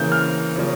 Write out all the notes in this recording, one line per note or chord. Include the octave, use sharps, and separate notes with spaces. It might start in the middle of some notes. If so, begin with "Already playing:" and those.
Already playing: C#3 E3 A#3 G6
F6
C#3 F3 A#3 C#4